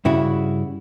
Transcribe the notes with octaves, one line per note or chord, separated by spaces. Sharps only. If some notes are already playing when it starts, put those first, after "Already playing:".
G2 C#3 E4 F#4